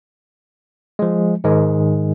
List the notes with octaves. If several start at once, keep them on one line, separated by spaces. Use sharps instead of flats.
F3 G#3
G#2 D#3 G#3